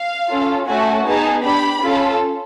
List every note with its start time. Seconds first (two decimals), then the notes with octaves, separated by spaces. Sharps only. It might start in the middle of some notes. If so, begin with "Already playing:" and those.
Already playing: F5
0.28 C#4 F4 A4
0.67 A3 C#4 F#4 A4 G#5
1.05 B3 D#4 G#4 A5
1.43 D4 G4 B5
1.81 C#4 F4 A4